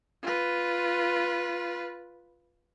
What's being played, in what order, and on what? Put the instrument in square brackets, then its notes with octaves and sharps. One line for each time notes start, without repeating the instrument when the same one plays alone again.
[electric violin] F4 B4